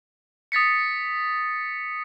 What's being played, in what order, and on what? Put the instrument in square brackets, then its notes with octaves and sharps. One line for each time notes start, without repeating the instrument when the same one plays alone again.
[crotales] D#6 A6 B6 C#7